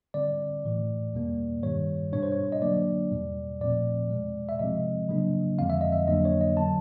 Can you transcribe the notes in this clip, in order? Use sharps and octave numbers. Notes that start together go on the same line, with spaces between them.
D3 G3 C4 D5
A2 E3 A3
E2 B2 G3 A#3
G2 D#3 G3 C#5
B2 G3 B3 D4 C#5
C5
C#5
D#5
D3 F#3 A#3 D4 D5
E2 B2 G3
A#2 F3 A3 C4 D5
E2 B2 G#3
E5
C3 F3 G#3 C4 D#5
C#3 F#3 A#3 D4
F2 D3 F3 G#3 C4 F5
E5
D#5
E5
F2 D3 F#3 A#3 D4 D#5
C#5
D#5
D3 F#3 B3 A5